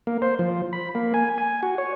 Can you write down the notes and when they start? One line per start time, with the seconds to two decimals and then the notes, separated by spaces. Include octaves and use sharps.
0.07 A#3
0.22 C5
0.39 F3
0.73 B5
0.95 A#3
1.14 G#5
1.38 G#5
1.63 F#4
1.78 C#5